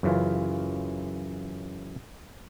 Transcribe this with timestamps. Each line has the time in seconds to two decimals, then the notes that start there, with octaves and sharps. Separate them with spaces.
0.03 F#2 C#3 E3 F4